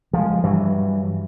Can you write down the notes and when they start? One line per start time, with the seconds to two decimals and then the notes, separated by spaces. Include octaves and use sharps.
0.13 F3 G#3
0.43 G2 E3 F#3